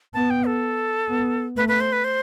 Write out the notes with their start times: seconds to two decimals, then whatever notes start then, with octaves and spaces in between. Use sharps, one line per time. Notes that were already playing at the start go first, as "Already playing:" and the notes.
0.14 B3 A5
0.30 G5
0.46 A4
1.09 B3
1.57 A3 B4
1.68 B4
1.80 C5
1.92 B4
2.04 C5